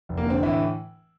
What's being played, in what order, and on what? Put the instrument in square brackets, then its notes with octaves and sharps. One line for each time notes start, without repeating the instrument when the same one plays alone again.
[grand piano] F1
A#3
D3 C4
A2 E3 E4